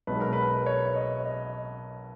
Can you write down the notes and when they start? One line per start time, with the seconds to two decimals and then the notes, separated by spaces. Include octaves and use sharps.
0.07 B1 B2 G#3 B4
0.20 A#4
0.33 B4
0.66 C#5
0.87 C#5
0.96 D#5
1.25 D#5